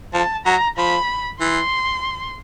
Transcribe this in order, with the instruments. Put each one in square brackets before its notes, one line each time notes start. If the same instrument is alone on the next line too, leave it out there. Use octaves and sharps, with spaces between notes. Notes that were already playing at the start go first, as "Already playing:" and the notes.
[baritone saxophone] F3 [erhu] A5
[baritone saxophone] F#3 [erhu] A#5
[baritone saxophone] F3 [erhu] B5
[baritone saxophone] E3 [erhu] C6